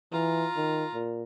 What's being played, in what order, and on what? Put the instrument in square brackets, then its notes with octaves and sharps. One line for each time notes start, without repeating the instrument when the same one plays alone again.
[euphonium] E3 [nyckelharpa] F4 A#5
[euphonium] D#3
A#2